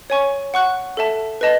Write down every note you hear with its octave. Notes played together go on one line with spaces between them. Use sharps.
C#5 G#5 C#6
F#5 C#6 F#6
A4 E5 A5
B4 D#5 A5